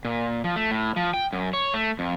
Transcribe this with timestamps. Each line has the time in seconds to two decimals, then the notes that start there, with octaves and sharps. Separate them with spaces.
0.05 A#2
0.44 F3
0.56 A3
0.71 A2
0.96 F3
1.14 G5
1.33 F#2
1.53 C#5
1.74 A3
1.99 F2